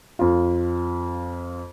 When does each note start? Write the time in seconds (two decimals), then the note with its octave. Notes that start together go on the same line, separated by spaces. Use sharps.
0.19 F2 F4